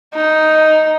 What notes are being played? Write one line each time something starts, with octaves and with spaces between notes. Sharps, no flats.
D#4